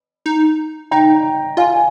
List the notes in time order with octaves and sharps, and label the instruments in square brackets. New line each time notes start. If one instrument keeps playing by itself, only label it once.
[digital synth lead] D#4
[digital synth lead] D#4 [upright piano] G5 A#5
[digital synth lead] F4 [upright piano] F5 G#5
[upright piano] G#5